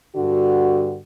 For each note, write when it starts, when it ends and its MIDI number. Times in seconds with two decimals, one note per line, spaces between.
0.16 0.98 43
0.16 0.98 50
0.16 0.98 66